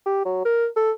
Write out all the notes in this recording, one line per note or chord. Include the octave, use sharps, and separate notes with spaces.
G4
F#3
A#4
A4